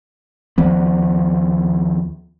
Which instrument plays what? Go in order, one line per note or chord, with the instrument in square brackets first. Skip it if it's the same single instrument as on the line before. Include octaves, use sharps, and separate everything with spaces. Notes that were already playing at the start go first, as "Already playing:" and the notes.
[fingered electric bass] D#2 F3 B3